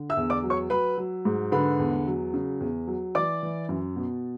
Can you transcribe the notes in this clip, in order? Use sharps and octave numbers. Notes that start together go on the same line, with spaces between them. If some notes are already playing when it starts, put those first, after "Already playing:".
Already playing: D3
E5 E6
E2
D5 D6
F#3
C#5 C#6
F#3 B4 B5
F#3
G#2
D3 B4 B5
E2
F#3
C#3
E2
F#3
E3 D5 D6
E3
F#2
B2